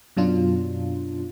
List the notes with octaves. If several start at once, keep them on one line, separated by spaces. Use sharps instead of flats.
F#2 B2 F#3 D4 F4